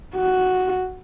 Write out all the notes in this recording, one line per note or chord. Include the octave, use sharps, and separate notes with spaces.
F#4